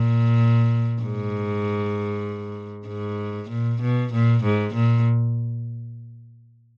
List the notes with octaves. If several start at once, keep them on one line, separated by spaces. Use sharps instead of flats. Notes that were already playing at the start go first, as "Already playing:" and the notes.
Already playing: A#2
G#2
G#2
A#2
B2
A#2
G#2
A#2